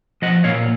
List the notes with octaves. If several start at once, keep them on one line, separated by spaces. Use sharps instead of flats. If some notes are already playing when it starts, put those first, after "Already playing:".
F3 D#5 F#5
A#2 C#5 F5